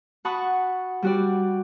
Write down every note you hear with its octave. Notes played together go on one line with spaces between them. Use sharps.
F#4 F#5 A5 B5 C#6 D#6
G3 F#4 D5